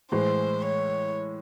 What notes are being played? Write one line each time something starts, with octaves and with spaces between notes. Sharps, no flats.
A2 E3 G#3 C5
C#5